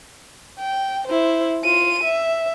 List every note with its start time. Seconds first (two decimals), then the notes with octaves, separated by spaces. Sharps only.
0.59 G5
1.07 E4 C5
1.64 F4 D#7
2.03 E5